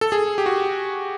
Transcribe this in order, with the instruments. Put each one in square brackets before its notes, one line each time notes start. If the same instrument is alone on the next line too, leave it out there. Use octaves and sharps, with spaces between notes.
[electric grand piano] A4
G#4
G4
F#4